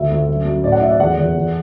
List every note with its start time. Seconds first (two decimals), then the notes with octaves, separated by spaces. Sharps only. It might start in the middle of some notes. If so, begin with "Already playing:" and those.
Already playing: D2 E5
0.11 D2
0.28 F#2
0.45 F#2
0.63 A2 D5
0.72 F#5
0.81 A2 E5
0.91 D5
0.99 E2 F#5
1.17 E2
1.35 E2